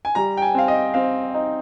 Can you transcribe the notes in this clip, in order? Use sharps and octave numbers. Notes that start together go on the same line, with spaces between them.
G#5
G3 A#5
G5
G#5
C4 F5
D#5
C4 F5
D#4